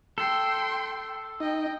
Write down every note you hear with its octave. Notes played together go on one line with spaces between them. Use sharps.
A4 G5 C6
D#4 D#5 G5